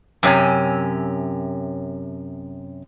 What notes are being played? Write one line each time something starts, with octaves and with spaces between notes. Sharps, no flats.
F#2 C3 C#4